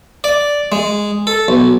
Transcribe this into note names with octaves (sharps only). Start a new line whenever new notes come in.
D5
G#3
A4
B1